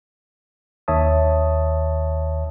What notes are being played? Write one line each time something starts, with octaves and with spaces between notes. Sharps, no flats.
D#2 D#3 C#5 E5 A5 D#6